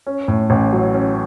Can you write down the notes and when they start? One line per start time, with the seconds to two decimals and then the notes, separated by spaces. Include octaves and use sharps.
0.07 C#4
0.28 A2
0.50 A1
0.73 F#3
0.94 C#4